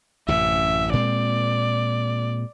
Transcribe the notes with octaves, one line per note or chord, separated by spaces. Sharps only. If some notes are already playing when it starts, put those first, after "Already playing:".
A1 F#2 C3 E5
A#2 G#3 C4 D5